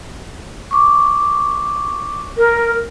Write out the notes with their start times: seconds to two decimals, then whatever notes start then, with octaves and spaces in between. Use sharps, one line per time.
0.71 C#6 D6
2.38 A#4